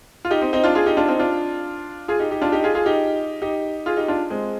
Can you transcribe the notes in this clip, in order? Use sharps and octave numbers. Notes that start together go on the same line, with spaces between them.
F4
D#4 G4
C4 D#4
C4 D#4
D4 F4
F4 G#4
D#4 G4
D4 F4
C4 D#4
D4 F4
F4 G#4
D#4 G4
D#4 G4
D4 F4
D#4 G4
F4 G#4
F4 G#4
D#4 G4
D#4 G4
F4 G#4
D#4 G4
D4 F4
G#3 C4